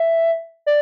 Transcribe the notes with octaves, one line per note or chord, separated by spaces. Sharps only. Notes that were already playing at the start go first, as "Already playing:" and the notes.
Already playing: E5
D5